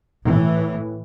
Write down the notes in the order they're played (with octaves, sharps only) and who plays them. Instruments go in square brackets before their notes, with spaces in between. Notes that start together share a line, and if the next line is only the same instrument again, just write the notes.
[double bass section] A2 E3